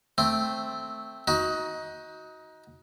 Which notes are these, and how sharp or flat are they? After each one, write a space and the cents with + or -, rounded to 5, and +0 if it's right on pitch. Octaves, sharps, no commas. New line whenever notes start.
A3 +0 C4 +0
D#4 +20 F#4 +0